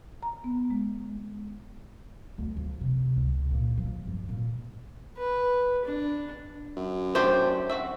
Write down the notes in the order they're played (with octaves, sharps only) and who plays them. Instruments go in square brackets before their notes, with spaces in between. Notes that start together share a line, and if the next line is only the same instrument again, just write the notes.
[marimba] A#5
B3
G#3
[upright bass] D2
F3
C3
C#2
A#2
F3
G2
A#2
[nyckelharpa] B4
D4
[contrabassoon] F#2
[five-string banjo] A3 D4 G4 [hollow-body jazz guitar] C5
[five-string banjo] C4 F#4 E5